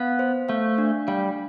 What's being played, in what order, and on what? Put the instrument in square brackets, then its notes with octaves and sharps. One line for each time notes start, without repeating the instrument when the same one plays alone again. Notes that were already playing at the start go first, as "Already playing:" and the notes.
Already playing: [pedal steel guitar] B3 [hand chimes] F5
[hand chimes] C5
[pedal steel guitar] A3 [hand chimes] F5
[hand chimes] D4
[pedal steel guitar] G3 [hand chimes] F5